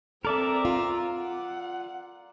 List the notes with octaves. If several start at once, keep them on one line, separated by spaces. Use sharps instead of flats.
C4 A4 A#4 D5 E5 A#5
F4
F#5